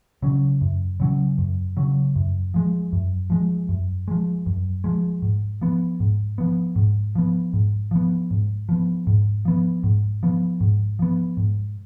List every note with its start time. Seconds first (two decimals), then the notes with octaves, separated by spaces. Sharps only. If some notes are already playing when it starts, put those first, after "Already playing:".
0.22 C#3 F#3 C#4
0.61 F#2
1.00 C#3 F#3 C#4
1.38 F#2
1.77 C#3 F#3 C#4
2.16 F#2
2.54 F3 G#3
2.93 F#2
3.30 F3 G#3
3.69 F#2
4.08 F3 G#3
4.46 F#2
4.84 F3 G#3
5.22 G#2
5.61 F3 B3
6.00 G#2
6.38 F3 B3
6.76 G#2
7.15 F3 B3
7.53 G#2
7.91 F3 B3
8.31 G#2
8.69 F3 B3
9.07 G#2
9.45 F3 B3
9.84 G#2
10.23 F3 B3
10.61 G#2
10.99 F3 B3
11.37 G#2